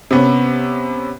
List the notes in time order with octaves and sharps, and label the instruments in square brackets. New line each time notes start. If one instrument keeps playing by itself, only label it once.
[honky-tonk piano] C3 B3 C#4